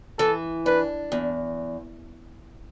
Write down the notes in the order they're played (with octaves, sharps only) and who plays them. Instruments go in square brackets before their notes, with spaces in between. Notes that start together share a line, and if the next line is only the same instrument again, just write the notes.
[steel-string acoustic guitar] E3 [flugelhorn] A4
[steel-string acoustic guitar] D4 [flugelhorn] B4
[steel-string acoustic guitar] E2